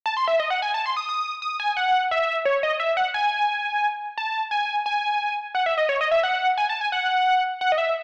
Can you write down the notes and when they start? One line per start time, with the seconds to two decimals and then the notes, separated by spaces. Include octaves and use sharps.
0.06 A5
0.17 C6
0.28 E5
0.40 D#5
0.50 F#5
0.62 G#5
0.74 A5
0.86 C6
0.97 D#6
1.09 D#6
1.42 D#6
1.60 G#5
1.77 F#5
2.11 E5
2.45 C#5
2.63 D#5
2.80 E5
2.97 F#5
3.14 G#5
4.18 A5
4.51 G#5
4.86 G#5
5.55 F#5
5.66 E5
5.78 D#5
5.89 C#5
6.01 D#5
6.11 E5
6.23 F#5
6.58 G#5
6.69 A5
6.81 G#5
6.92 F#5
7.61 F#5
7.72 D#5
7.78 E5